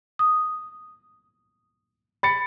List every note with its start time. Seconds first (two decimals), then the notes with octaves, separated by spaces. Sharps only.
0.19 D#6
2.23 B5 A6 C#7